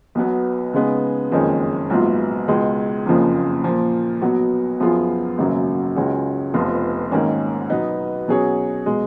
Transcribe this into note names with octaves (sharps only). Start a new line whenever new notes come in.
B1 B2 F#3 B3
C#3 G#3 B3 D#4
F#1 F2 D#3 G#3 C#4
A#1 G#2 F#3 B3 F4
C#2 B2 G#3
F#1 F2 C#3 F3 A#3
A#2 F3 A#3
B1 B2 F#3 B3 F#4
F#2 F3 B3 F4 G#4
G#1 F#2 C#3 F#3 A#3
C#2 C#3 G#3 C#4 F#4
F1 F2 F3 B3 F4
G#1 G#2 D#3 A#3 C#4
B2 F#3 B3 D#4
B2 F#3 C#4 G#4 C#5
B2 G#3